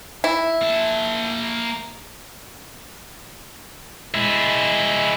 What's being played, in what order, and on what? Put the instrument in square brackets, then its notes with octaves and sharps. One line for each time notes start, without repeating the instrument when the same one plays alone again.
[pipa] E4
[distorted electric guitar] A#3 A5
G#3 E4